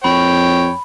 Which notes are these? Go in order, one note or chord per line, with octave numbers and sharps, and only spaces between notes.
F2 C#5 G5 B5